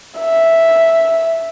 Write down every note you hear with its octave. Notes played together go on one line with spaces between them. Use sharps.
E5